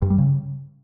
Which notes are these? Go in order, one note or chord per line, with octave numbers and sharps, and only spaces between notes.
G2
G3
C#3